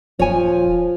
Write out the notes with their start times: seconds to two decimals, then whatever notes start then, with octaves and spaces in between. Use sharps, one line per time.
0.19 D#1 F3 C#5 G#5